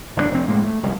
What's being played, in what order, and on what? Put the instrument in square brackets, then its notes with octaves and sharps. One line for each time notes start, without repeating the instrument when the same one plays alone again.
[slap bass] F#1 E2 C3 D4
F1 C4
A2 G#3 A#3
A3
F1 C2